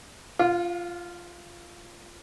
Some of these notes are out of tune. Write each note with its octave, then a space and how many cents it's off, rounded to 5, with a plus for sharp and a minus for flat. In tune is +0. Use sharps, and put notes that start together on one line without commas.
F4 -10 F5 +40